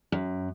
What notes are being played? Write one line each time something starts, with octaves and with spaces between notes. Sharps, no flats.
F#2